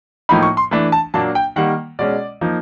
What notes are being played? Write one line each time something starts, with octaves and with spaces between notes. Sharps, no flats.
A2 F3 A#3 D#4 B5
C#6
C6
E3 A3 D4
A5
A#2 F#3 A#3 D4 A5
G5
D#3 G3 A#3 F#5
B2 G#3 C#4 D5
F3 A#3 D#4